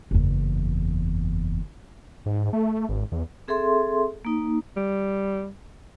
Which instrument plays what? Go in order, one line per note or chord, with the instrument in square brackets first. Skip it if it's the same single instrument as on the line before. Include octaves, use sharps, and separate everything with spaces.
[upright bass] F#1 E2
[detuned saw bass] G#2
A3
G#1
E2
[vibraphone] C4 G#4 A4 E5 C6
A#3 D#4
[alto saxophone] G3